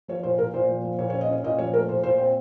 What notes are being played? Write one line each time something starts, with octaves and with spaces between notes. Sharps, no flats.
F3 C#5
A#2 C5
A#2 A#4
A#2 C5
F3
F3
A#2 C#5
C#5
C#4
D#5
C#4 C#5
A#2 D#5
F3 C#5
A3 A#4
A#2 C5
A#2 C5
C4 C5